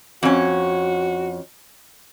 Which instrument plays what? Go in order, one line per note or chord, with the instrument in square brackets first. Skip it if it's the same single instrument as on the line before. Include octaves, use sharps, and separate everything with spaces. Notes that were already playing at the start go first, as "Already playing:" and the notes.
[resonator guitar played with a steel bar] F2 C#4 [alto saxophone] F#4